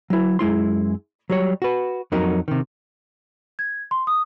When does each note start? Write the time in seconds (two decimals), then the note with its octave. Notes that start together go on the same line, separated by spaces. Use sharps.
0.10 F#3 E4
0.39 F#2 G#3 E4 C6
1.29 F#3 G3 C#5
1.62 F#4 B4
2.12 F2 F#3 D#4 A#4
2.48 C3 D#3
3.59 G#6
3.91 C6
4.07 D#6